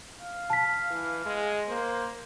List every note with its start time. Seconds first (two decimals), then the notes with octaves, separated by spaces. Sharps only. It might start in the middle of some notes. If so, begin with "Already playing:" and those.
0.19 F5
0.50 A5 B6
0.91 E3
1.26 G#3
1.68 A#3 C5